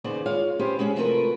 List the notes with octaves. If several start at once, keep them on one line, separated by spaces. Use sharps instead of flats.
D#2 C#3 B3 C5 D5
G#3 F4 C#5 F5
B3 C#4 G4 C5 F5
G#3 C#4 F#4 G#4
C3 F3 A3 F#4 A#4 B4